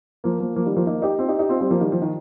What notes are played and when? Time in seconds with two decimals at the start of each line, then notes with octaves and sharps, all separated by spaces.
0.24 F3 A#3
0.40 F3 A#3
0.56 F3 A#3
0.66 D#3 G3
0.76 F3 A#3
0.87 A#3 D#4
1.02 D#4 G4
1.19 C4 F4
1.28 D#4 G4
1.39 D#4 G4
1.49 C4 F4
1.61 G3 C4
1.71 F3 A#3
1.81 D#3 G3
1.92 F3
2.02 D#3